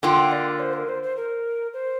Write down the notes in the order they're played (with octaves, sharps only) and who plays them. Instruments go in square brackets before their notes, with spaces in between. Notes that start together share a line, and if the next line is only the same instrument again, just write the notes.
[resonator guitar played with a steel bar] D3 A#3 F4 [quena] G5
[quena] D5
C5
A#4
C5
C5
A#4
C5